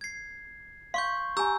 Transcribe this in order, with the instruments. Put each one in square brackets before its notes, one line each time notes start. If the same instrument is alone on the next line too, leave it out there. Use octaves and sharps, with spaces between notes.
[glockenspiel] G#6 C7
[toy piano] F5 [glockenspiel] C6 C#6 G6
[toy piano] G4 G#5 [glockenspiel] A#5 E6 G6